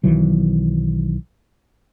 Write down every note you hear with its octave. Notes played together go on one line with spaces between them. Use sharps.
B1 D#3 E3 F#3